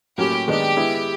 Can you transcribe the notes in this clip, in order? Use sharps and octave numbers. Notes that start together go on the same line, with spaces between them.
A2 F#3 A#3 C#4 G4
D#3 G#3 B3 D4 G4
G#3 B3 E4